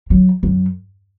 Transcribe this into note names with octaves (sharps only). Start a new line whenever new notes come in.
F#3
F#2